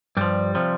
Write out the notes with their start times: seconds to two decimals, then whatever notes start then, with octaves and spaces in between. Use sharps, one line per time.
0.17 G2 F3 G3
0.55 C3 F3